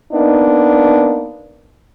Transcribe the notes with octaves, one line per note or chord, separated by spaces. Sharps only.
A#3 B3 D4 D#4